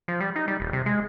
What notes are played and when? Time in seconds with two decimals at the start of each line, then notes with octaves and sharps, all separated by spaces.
0.08 F3
0.21 G3
0.36 D#4
0.48 G3
0.60 D#1
0.73 C3
0.86 G#3